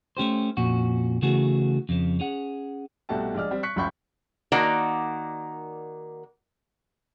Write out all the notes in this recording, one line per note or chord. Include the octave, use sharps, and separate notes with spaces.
A3 C#4 G4 C5
F2 A#2 C#4 F#4
C#3 E3 A3 B3 F#4 G#4
F2 C#3 F3
C#4 G#4 F#5
C2 B2 A3 F#4 G4 A5
A#1 G#3 D5 F6
G3 C4
C#6 F#6 B6 C#7
F#1 C#2 F3 B5 C#6 G6
D#3 A#3 F#4 D5